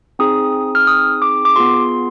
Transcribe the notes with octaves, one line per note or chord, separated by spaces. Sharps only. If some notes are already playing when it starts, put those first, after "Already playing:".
C4 D#4 G#4 D#6
F6
D#6
D6
D6
B3 F4 G#4 C6